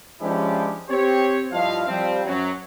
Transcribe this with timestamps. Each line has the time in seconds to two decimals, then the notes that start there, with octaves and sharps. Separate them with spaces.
0.21 F3 G#3 C#4 D4 E4 G4
0.90 C4 G4 C#5
1.52 G2 F3 E4 D#5 F5
1.87 F3 G3 C4
2.26 F#2 F#3